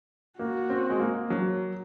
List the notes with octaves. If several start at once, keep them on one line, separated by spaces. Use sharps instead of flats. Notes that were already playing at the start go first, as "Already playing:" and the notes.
A#3 F#4
C4
G#3
A#3
F#3